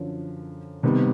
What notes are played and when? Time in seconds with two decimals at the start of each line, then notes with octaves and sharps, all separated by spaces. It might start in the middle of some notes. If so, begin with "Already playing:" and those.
Already playing: F#2 D3 F3
0.83 C3 D#3 G3 B3